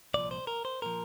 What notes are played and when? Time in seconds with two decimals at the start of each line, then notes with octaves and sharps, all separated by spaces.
0.14 C2 A#2 F3 D5
0.31 C5
0.47 A#4
0.65 C5
0.82 A#2 F3 A#4